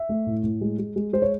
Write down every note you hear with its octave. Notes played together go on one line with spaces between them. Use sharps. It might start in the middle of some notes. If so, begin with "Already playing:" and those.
Already playing: E5
A3
A2
A2
G#3
G#3
G#3
G#3 C5
C#5